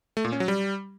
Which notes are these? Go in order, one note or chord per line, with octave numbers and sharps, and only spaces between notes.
A3
A#2
C#4
F#3
G3